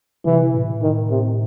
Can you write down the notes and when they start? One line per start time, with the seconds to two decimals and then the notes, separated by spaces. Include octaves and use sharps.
0.25 C3 E3
0.54 A2
0.82 D#3
1.10 C3